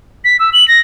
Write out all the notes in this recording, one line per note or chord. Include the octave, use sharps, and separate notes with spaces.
B6
E6
F#7
A#6